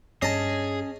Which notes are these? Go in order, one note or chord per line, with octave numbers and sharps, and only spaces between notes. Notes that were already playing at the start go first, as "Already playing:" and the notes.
G2 C#4 G#4 D#5 A5